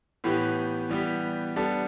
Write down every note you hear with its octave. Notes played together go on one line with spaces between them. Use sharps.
A2 E3 B3 G4 B4
E3 G3 B3 G4
G3 B3 D4 A4